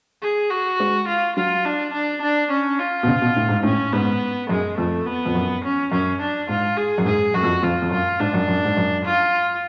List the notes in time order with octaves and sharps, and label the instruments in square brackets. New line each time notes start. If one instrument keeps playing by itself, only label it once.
[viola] G#4
F#4
[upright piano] G#3
[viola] F4
[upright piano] F#3 [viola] F4
[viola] D4
D4
D4
C#4
F4
[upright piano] B2
C#3
B2
A2
G#2
[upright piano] A2 [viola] C#4
[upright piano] G#2 [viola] B3
[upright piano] F#2 [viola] G#3
[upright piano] F2 [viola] A3
[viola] B3
[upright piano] F2
F#2
[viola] C#4
[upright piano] F#2 [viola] C#4
[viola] D4
[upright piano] G#2 [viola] F4
[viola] G#4
[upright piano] F#2
[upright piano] G#2 [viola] G#4
[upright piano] F#2 [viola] F#4
[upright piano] F2
[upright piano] F2 [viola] F4
[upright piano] F2
[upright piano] F#2 [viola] F4
[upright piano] G#2 [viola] D4
[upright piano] F#2
F#2
G#2
F#2
[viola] F4